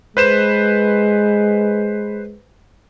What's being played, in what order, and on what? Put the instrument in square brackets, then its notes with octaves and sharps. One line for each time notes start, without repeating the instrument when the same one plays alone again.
[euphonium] G#3 [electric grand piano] B4 C5 E7